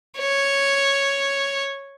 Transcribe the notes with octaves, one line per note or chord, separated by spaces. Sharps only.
C#5